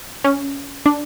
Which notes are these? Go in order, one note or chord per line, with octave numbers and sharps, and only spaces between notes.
C#4
D4